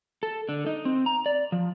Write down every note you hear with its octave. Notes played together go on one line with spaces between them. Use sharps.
A4
D3
D#4
C4
A#5
D5
F3